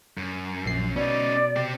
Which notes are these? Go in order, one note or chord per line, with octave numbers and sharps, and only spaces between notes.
F#2
A#1 C7
B2 C#4 D#4 D5
C4 G4